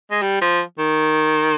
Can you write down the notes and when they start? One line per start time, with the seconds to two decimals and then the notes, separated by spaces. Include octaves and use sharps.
0.11 G#3
0.22 G3
0.41 F3
0.78 D#3